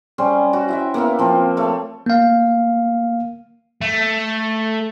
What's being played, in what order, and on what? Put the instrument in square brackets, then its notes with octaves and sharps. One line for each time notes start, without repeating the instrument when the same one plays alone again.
[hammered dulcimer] G3 C#4 C5
F#4
E4 E5 G5
A#3 B3 E4 F5
F3 C4
A3 C#5
[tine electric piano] A#3 F5
[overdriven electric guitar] A3